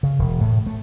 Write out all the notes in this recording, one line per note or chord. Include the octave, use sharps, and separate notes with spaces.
C#3
E1
A2
A3